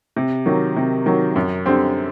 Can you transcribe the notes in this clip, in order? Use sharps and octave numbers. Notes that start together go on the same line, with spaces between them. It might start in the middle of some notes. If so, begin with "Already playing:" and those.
C3
D#3 F#3
C3
D#3 F#3
F#2
D3 G3 C4